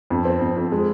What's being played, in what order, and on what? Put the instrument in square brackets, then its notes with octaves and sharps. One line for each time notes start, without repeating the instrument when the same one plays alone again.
[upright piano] F2
C4
F2
F2
G#3